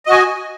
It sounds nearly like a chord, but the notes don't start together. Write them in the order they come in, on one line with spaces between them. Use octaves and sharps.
D#5 F#4 G#5